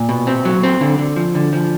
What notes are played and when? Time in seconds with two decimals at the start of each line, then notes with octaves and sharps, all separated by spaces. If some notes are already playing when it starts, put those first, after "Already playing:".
Already playing: A#2
0.09 B2
0.27 C4
0.45 F#3
0.63 C4
0.81 D3
0.99 D3
1.16 F3
1.35 D3
1.53 F3